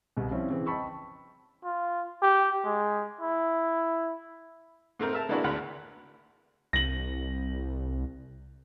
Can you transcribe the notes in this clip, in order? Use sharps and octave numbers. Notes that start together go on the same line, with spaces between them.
C2 B2
F3 G3 C4 C#4 E4
C#3 E3 C4
D#5 G5 A5 B5 C#6 E6
F4
G4
G#3
E4
G#2 A3 C4 A#4
A#4 E5 A5
G#3 A#3 B3 D4 E4 F#4
G#1 D2 F#5 B5
C2 A#6 F#7